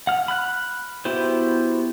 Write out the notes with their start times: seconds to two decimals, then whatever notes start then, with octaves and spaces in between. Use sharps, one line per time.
0.07 F#5 F6
0.28 B5 F6 F#6
1.05 B3 E4 F#4 G4 C5